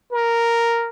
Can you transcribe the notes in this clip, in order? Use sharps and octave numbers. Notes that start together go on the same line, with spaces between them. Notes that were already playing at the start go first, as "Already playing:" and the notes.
A#4